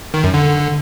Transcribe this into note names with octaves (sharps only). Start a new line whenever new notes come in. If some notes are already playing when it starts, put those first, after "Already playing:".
D#3
F#2
D3